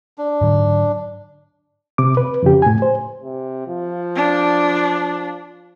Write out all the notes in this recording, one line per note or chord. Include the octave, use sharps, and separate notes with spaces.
D4
G#2 D3 F#3
C3 D6
B4
F2 C#3 G4
A2 G#5
C5
C3
F3
D4